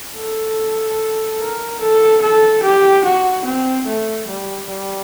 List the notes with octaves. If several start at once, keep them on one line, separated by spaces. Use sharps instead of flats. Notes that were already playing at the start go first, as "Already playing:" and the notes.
A4
A#4
A4
A4
G4
F#4
C4
A3
G3
G3